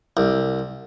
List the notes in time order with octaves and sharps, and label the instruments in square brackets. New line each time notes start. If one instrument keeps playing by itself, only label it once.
[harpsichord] C2